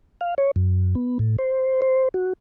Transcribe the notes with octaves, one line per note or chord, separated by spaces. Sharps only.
F5
C#5
F#2
B3
A2
C5
C5
F#4